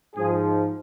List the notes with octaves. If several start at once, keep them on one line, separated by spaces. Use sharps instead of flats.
G#2 F3 G#4